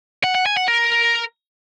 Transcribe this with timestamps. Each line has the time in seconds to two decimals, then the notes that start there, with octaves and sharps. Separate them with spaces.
0.24 F#5
0.35 F#5
0.46 G#5
0.57 F#5
0.68 A#4